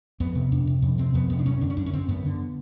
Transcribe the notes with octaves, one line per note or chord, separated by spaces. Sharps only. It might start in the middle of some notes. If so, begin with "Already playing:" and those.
F2 B3
C3
F2 D4
C3
F2
C3 C4
F2 B3
C3 B3
D4
F#2 C#4
D3 D4
C#4
F#2 D4
C#4
D3 C4
F#2 B3
D3